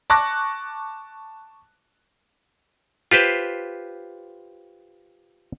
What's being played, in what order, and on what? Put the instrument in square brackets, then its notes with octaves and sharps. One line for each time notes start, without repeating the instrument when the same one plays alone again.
[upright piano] A5 C#6 D6 F#6 A#6
[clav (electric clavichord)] F4 G4 B4 C5